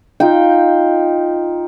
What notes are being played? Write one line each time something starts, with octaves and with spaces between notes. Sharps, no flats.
D#4 F4 G5